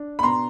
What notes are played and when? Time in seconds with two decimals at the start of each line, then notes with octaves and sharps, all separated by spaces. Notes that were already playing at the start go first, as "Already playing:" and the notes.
Already playing: D4
0.19 B5
0.23 B2 A#5 C6